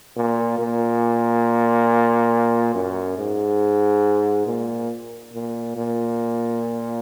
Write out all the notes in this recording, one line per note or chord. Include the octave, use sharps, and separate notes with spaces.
A#2
A#2
F#2
G#2
A#2
A#2
A#2